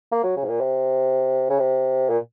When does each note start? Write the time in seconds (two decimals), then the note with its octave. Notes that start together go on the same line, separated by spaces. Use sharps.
0.12 A#3
0.23 F#3
0.36 C#3
0.44 G#2
0.48 A#2
0.60 C3
1.50 C#3
1.59 C3
2.09 A#2